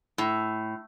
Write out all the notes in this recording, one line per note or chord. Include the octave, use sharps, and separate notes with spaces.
A2